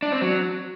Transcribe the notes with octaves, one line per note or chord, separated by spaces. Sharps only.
D4
C4
F#3